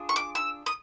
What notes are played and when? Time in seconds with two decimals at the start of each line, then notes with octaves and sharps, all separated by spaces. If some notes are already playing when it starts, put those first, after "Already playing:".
Already playing: D4 F4 G#4
0.09 C#6
0.16 D6
0.35 E6
0.66 D#6